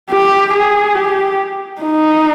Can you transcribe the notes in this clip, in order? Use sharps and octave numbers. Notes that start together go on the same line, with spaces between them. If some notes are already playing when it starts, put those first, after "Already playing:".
G4
G#4
G4
D#4